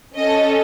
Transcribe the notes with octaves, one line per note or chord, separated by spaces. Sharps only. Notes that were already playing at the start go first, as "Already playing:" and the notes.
C#4 A4 D#5